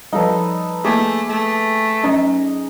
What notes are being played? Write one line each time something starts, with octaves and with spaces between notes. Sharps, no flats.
F3 G3 D#4 A4 B4
A3 A#3 G#4 G#5 D6
A3
F#3 C#4 D#4